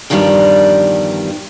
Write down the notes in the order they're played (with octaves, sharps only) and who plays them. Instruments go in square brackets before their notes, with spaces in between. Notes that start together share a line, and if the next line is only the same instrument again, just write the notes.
[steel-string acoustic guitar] E2 G2 D#3 F3 G3 D4